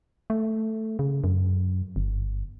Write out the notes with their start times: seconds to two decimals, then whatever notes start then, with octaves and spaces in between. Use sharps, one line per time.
0.30 A3
0.99 C#3
1.24 F#2
1.96 G1